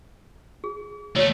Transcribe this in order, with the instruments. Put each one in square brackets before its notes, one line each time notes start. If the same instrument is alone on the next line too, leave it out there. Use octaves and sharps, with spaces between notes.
[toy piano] G#4
[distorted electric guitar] D#2 A3 [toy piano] C#5 D5